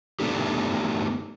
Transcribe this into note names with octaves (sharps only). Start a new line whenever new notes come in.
A3 B3 D4 D#4 G4